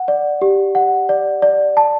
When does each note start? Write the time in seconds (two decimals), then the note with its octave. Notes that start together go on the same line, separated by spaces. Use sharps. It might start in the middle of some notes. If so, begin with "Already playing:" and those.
Already playing: F#5
0.08 D5
0.42 G4
0.75 F#5
1.09 D5
1.42 D5
1.77 A5